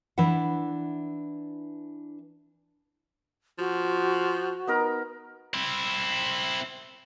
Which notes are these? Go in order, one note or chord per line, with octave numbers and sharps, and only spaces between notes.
E3 D4 E4 B4 F#5
F3 F#4
B3 D#4 A#4
C4 E4